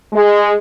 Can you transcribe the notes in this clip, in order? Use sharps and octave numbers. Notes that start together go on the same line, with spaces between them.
G#3